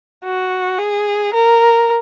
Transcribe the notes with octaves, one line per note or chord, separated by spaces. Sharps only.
F#4
G#4
A#4